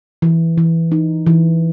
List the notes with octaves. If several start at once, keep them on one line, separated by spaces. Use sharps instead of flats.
E3
E3
D#4
E3